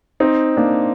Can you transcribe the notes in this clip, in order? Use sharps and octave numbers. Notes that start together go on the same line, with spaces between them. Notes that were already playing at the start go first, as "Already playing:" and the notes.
C4 D#4
A#3 D4